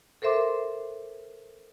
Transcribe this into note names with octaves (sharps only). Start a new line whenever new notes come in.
A4 A#4 C5 E5 C6 D6